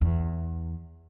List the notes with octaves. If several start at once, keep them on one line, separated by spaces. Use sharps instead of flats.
E2